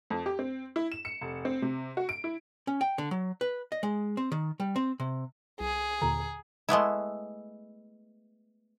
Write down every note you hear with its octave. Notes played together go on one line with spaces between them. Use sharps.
F2
G4
C4
E4
E7
C#7
F1
C4
C3
F#4
D7
E4
C#4
G5
D3
F#3
B4
D#5
G#3
C4
D#3
G3
C4
C3
C2 G#4
D#2 A#2 D3 A#5
G#3 A3 B3 E4